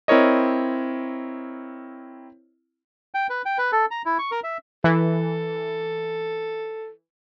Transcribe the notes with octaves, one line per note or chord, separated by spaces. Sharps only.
C4 E4 A#4 C#5 D#5
G5
B4
G5
B4
A4
A#5
E4
C#6
A#4
E5
E3 A4